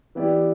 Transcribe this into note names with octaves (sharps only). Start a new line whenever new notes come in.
E3 B3 E4 G4 D5